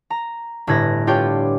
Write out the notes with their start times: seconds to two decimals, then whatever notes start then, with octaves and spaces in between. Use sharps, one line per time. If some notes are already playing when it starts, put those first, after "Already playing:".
0.10 A#5
0.67 G1 A2 B4 G#6 A#6
1.07 D4 F4 G4 C#5 G5